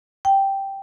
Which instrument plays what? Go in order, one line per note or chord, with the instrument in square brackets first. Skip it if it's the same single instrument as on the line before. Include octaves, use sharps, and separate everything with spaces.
[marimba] G5